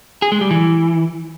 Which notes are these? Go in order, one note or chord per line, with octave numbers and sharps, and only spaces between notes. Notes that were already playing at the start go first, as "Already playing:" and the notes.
G#4
G#3
G3
E3